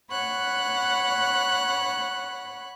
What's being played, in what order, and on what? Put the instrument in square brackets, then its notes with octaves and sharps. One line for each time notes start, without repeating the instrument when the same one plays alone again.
[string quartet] C#5 F#5 B5 F#6